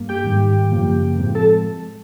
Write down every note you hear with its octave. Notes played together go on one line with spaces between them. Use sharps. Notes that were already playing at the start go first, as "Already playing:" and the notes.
Already playing: G2 A#3
G4 G5
G#2 D#3 G3
F#2 C#3 F3 A#3
A2 F3 G#3 C4
A4 A5